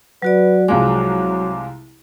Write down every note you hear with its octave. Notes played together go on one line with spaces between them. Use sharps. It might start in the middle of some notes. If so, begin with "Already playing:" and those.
F#3 F#4 B4 D5
C2 F3 F#3 G#3 D6